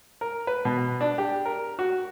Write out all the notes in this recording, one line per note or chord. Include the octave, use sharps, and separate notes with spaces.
A#4
B4
B2
D4
G4
A#4
F#4